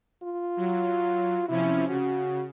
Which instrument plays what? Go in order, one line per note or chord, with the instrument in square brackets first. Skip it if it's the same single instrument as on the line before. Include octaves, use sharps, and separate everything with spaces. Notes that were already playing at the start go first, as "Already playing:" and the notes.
[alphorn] F4
[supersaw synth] F#3
[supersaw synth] C3 F3 C#4 [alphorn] E4
[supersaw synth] C#3 [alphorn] F#4